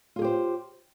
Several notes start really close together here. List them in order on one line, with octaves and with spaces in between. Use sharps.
F4 G#4 G4 C5